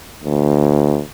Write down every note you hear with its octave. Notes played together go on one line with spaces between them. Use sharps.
D2